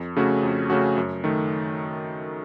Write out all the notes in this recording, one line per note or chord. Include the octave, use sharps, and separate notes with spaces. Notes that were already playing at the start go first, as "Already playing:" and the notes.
Already playing: F2
C#3 A3 C#4 F#4
F2
C#3 A3 C#4 F#4
F#2
D#3 A3